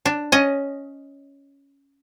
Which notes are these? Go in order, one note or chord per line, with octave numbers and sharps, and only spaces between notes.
D4
C#4 D#5